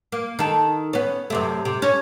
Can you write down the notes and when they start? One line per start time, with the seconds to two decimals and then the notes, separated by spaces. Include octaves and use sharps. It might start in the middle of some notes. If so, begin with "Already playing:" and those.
0.12 A#3
0.39 D#3 A4
0.93 B3 C#4
1.30 F#2 C3 A3
1.65 C3
1.82 C#4